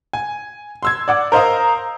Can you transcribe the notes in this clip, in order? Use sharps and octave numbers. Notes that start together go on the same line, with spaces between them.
G#5
C6 E6 G#6
D5 F#5 D6
A#4 C5 D#5 F5 D#6